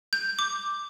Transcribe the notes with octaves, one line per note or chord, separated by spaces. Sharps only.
G6
D6